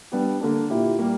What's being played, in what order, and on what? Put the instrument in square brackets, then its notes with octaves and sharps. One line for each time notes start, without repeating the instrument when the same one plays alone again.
[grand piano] G3 B3 D4 G4
D3 A#3 D4
A#2 A#3 E4 G4
G3 A#3